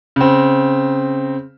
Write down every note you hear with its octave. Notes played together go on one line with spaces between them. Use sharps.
C#3 C4